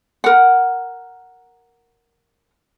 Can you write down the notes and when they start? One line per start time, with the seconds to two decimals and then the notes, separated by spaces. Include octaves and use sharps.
0.24 A#4 F#5